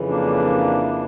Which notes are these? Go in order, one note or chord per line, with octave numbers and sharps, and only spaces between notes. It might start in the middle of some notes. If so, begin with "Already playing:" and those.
Already playing: F2 C#3 E3
A#3 D4